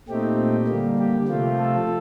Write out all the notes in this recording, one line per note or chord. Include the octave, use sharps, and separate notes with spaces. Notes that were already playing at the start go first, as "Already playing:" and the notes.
A#2 A3 C4 D#4 G4
D3 G3 A#3
G4
C3 F3 A3 C4 F4
A4